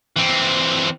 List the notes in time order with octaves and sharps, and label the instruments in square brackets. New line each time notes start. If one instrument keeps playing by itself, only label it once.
[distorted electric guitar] E3 C4